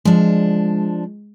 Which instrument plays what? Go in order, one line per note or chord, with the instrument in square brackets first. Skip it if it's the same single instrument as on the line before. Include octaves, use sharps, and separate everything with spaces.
[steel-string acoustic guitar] F3 D4 [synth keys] G#3